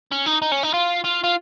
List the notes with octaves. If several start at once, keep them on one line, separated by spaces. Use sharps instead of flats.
C#4
D#4
D#4
C#4
D#4
F4
F4
F4